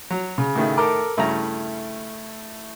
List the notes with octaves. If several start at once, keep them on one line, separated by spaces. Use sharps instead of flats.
F#3
C#3
A2 D#3 A3
A4 A#4 D6
G2 C#3 A3 E4 A#5